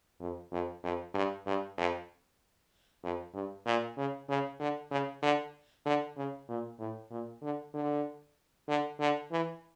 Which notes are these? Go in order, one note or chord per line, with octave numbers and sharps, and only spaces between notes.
F2
F2
F2
G2
G2
F2
F2
G2
A#2
C#3
C#3
D3
C#3
D3
D3
C#3
A#2
A2
A#2
D3
D3
D3
D3
E3